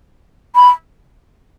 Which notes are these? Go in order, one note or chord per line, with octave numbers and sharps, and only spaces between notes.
B5